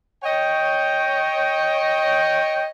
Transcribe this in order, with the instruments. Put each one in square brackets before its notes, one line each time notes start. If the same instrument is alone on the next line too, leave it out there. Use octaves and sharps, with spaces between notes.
[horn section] C#5 D#5 G5